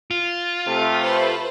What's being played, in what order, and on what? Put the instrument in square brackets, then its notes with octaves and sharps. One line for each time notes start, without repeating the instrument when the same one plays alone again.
[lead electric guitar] F4
[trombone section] C3 A3
[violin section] B4 C5